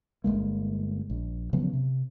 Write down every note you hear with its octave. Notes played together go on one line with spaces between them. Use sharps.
G1 G#2 G#3 A#3
A#1
C#3 F3 F#3 B3
C3